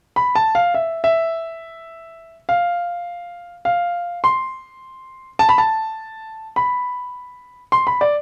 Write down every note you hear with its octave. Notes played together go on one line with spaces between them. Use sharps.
B5
A5
F5
E5
E5
F5
F5
C6
A5
B5
A5
B5
C6
B5
D5